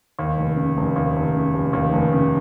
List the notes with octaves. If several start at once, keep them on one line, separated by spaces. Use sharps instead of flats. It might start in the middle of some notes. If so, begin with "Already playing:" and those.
D#2
F1
C#3
F1
D#2
F1
C#3
F1
D#2
F1
C#3